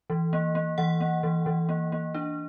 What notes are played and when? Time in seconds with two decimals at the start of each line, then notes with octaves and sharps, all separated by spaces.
0.10 E3
0.33 A#3
0.55 A#3
0.78 E3 F#5
1.01 A#3
1.23 E3
1.46 E3
1.69 A#3
1.92 A#3
2.14 D4